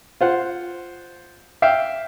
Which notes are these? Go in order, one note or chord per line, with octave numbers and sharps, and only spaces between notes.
F4 C5 F#5
E5 F5 G5